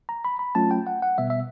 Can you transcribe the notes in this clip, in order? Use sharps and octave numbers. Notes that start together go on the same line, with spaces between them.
A#5
B5
B5
F#3 A3 C#4 F4 A5
G5
F#5
F#5
B2 G3 B3 E5
E5